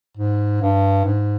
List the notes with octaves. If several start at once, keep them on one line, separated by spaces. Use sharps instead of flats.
G#2
G2
G#2